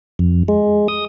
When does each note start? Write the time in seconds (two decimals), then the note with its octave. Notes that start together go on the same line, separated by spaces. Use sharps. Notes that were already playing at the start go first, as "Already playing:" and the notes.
0.19 F2
0.48 G#3
0.88 D#6